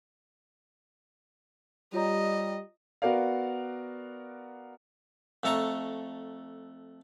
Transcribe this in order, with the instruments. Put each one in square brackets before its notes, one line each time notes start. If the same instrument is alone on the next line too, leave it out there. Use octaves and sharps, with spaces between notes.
[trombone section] G3 [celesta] F4 C#5 A#5 [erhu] D#5
[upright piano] B3 F#4 A#4 D5 F5
[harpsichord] F2 A3 A4 A#5 C#6